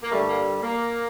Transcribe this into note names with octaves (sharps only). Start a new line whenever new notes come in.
A#3
G2 D3 G3 A3
A#3
A#3